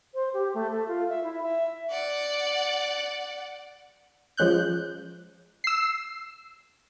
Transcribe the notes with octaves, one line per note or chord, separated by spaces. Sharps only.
C5
G4
A3
A4
F4
E5
E4
E5
D5 F#5
F3 G#3 C#4 F#6 G6
E6 C7